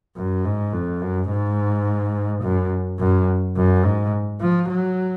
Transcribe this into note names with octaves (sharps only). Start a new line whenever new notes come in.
F#2
G#2
F2
F#2
G#2
F#2
F#2
F#2
G#2
F3
F#3